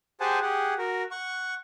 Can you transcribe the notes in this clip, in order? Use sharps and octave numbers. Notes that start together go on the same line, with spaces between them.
G4 G#4 C5 F#5 G#5 A5
G4 G#4 F#5
F#4 A#4
F#5 C#6